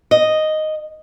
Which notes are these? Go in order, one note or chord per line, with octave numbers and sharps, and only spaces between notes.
D#5